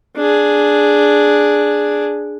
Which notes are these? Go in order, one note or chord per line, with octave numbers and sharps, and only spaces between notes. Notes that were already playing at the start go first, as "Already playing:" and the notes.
D4 G#4